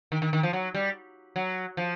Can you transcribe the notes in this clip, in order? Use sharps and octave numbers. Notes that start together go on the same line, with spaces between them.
D#3
D#3
D#3
F3
F#3
G3
F#3
F3